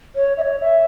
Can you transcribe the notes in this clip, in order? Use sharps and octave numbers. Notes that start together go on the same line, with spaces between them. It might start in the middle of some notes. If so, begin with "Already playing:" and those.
C#5
E5
C#5
E5